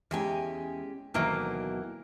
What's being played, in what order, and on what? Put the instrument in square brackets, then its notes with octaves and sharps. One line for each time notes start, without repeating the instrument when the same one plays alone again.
[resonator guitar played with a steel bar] E2 G#5 [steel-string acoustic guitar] G#3 C#4 G4
[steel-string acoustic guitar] D2 B2 F#3 [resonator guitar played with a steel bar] D#3 E3 A#3